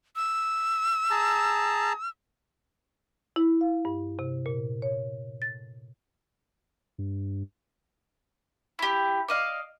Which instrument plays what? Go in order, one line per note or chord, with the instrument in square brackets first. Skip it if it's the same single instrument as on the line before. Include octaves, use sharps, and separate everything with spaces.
[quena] E6
[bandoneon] G#4 A5 A#5
[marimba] E4
F5
G2
C3
A#2
C#5
A6
[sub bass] G2
[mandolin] E4 G4
D5 D#5 F5